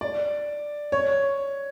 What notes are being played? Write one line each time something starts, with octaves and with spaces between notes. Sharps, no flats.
D5
C#5